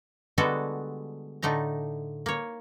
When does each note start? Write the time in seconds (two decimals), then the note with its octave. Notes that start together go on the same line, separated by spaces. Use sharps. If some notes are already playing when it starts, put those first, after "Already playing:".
0.38 D3 G3 G#3 B3 F#4 A4
1.43 A2 D3 A3 D#4 A#5
2.26 A#3 C#5